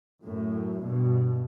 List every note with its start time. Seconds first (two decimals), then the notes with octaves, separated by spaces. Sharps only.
0.23 F#2 A2
0.81 G2 B2